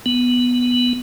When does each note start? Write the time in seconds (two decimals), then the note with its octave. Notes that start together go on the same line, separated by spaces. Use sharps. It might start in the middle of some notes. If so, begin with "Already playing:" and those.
0.06 B3